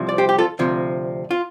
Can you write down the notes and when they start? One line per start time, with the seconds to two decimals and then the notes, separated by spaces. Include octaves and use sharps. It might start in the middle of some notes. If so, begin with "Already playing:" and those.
Already playing: C2 C3 F3
0.09 D5
0.18 G4 C5
0.29 G4
0.38 F4 A4
0.59 D2 C3 F3
1.31 F4